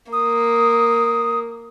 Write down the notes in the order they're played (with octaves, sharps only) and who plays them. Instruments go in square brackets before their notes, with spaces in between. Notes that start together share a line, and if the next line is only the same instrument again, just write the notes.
[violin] A#3 [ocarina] D#6